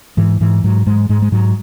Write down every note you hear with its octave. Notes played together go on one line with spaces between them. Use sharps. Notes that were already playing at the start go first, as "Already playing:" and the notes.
G#2 E3
G#2 E3
G#2 F#3
G#2 G#3
G#2 G#3
G#3
G#2 F#3